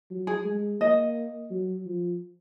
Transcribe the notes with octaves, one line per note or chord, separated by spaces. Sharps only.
F#3
G#4
G#3
A#3 D#5
F#3
F3